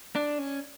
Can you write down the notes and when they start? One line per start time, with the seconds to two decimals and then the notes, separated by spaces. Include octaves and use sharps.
0.15 D4
0.39 C#4